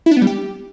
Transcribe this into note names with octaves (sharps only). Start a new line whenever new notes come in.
E4
D4
B3
G3
G4